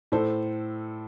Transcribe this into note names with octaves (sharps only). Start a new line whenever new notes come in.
A2 A4 C5